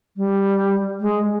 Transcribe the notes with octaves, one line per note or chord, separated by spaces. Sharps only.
G3
G#3